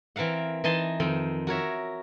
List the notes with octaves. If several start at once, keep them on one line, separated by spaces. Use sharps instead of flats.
E3 C4 A#4 F5 F#5
E3 D#4 D#5 A5 C6
F2 D#3 C4
F#4 A#4 C#5 E5